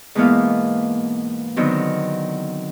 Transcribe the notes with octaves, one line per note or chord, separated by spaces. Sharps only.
G#2 B2 E3 A#3 B3 F5
D3 D#3 F#3 B3 C4